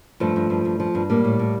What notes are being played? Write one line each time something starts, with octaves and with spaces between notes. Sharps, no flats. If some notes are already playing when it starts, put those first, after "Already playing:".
G2 F3 A3
G2
G2
G2
F3
G2
A2 G3 A#3
A2
A2